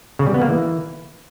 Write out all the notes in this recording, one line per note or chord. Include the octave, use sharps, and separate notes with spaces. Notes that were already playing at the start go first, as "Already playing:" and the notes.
C#3
G3
B3
A#3
E3